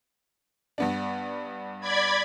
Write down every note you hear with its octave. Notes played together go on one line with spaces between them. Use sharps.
G2 B3 D4
D5 B5 G#6